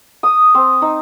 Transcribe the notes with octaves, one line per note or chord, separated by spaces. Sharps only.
D#6
C4
D#4